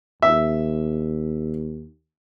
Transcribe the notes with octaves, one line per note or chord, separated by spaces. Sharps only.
D#2 E5